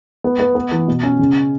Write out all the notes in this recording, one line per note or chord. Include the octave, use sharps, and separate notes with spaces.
B3
B3
B3
E3
B2
C#4
C#3